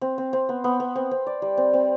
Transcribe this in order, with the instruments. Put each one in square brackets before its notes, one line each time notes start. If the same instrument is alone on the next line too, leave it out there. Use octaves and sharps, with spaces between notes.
[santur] C4
C4
C4
B3
B3
B3
C4
C4
D5
G3
C4
C4